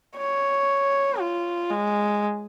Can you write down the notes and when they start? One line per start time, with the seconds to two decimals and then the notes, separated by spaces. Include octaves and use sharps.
0.17 C#5
1.20 F4
1.71 G#3